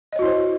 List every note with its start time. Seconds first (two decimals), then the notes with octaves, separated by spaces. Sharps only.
0.13 D#5
0.16 C#5
0.19 F#4
0.22 E4
0.26 C5